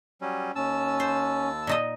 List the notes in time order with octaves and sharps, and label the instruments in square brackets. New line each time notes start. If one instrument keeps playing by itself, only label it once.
[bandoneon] F#3 G3 C#4
[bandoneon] D#2 A5 E6 [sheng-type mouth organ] C#4
[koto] C5
A#2 D#4 D#5